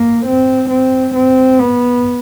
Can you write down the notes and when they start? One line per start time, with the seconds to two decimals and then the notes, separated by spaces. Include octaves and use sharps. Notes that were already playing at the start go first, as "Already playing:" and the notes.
Already playing: A#3
0.26 C4
0.70 C4
1.15 C4
1.59 B3